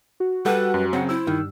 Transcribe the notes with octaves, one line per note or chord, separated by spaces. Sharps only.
F#4
G3 A4 B4 F#5
F#2
C#3 F#3 C4 F#5
E4 C5 E6
G2 D#3